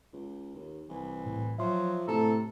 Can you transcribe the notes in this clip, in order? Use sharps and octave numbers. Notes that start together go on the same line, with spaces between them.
C#2
D#2
C2 E3
A2
F3 F#3 E5 C6
A2 C3 A4 A#5